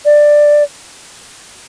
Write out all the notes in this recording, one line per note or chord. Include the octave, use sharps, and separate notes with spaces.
D5